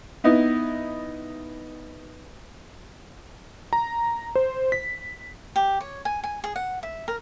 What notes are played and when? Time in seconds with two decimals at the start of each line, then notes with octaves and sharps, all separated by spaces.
0.24 B3 D#4 E4
3.73 A#5
4.35 C5
4.72 B6
5.56 G4
5.81 C#5
6.05 G#5
6.24 G#5
6.44 G#4
6.56 F#5
6.83 E5
7.08 A#4